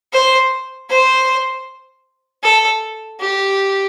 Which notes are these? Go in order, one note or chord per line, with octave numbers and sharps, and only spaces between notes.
C5
C5
A4
G4